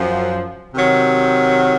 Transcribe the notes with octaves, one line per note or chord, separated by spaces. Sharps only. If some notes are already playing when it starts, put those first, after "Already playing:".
Already playing: F#2 F3
C3 D#3 F#3